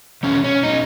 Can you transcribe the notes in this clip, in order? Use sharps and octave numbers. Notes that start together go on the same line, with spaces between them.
E2 B2 C#4
C#4
B2 D#4